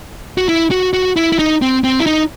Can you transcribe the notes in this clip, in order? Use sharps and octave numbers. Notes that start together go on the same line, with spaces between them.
F#4
E4
F#4
F#4
E4
E4
D#4
C4
C4
E4
D#4